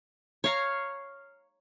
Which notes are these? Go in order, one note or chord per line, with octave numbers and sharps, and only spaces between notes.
C#5 F5 A#5